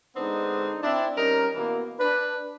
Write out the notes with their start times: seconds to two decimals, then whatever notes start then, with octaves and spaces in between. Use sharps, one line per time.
0.16 D3 G#3 B3 C4 D4 D#4
0.83 C4 D4 E4
1.17 G3 C#4 D#4 A#4
1.55 B2 E3 A#3
1.99 D4 B4